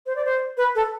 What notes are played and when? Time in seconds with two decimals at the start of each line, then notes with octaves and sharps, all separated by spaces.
0.06 C5
0.16 D5
0.25 C5
0.57 B4
0.75 A4